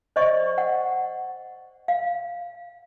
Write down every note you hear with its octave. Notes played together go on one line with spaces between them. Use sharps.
C5 D5 D#5 C#6
F#5
F5